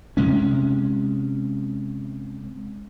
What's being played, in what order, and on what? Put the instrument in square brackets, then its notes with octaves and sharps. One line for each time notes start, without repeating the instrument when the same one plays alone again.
[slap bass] C3 G#3 C#4